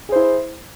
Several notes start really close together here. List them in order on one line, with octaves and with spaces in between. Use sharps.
G#4 C5 E4